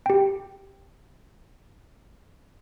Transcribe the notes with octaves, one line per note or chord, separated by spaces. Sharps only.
G4 G5